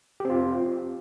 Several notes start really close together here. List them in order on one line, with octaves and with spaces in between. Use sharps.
G4 C4 F4